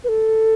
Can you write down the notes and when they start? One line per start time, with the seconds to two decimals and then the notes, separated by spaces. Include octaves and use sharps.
0.04 B4
0.09 A4